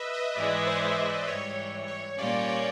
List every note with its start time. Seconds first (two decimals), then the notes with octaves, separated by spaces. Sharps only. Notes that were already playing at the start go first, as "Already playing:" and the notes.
Already playing: B4 D#5 E5
0.14 D#5
0.36 G#2 E3 G#3 D5
0.58 B4
0.67 C5
0.97 C5
1.27 G#2 E3 G3 C#5
1.57 C#5
1.88 C#5
2.18 A#2 G3 A#3 C#4 F4 D5
2.49 D5